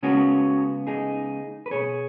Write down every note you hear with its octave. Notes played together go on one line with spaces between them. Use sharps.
C#3 G#3 B3 C#4 F#4
D#4 G#4
B4
B2 B3 G#4 C#5